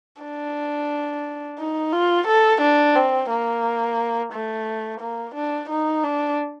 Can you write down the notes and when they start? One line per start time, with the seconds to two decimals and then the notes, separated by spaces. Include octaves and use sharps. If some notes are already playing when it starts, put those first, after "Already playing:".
0.22 D4
1.59 D#4
1.93 F4
2.27 A4
2.61 D4
2.96 C4
3.30 A#3
4.33 A3
5.00 A#3
5.35 D4
5.69 D#4
6.04 D4